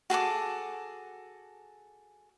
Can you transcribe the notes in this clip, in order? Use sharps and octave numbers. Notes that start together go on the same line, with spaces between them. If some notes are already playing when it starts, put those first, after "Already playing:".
F#4 G#4 A4 D6